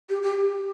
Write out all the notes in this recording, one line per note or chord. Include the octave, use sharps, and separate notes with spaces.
G4
G4